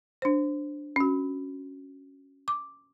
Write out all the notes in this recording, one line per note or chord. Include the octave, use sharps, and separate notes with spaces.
D4 C5
C#4 F#4
D6